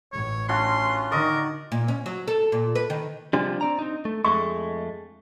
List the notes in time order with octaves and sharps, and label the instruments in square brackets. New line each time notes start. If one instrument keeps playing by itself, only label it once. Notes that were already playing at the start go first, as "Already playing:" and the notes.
[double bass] A1 A2 [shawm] C#5
[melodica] C#4 F4 [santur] D4 F#4 [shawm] C6
[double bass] D3 D#3 [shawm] A#4 [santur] D5 D#5 C#6
[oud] A#2
C#4
F#3
A4
A#2
B4
D#3
[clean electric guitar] C3 F3 G3 [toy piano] D4
[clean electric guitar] C4 D5 A#5
C4 D#4
A3
[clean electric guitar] F2 G#3 A3 [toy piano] C#6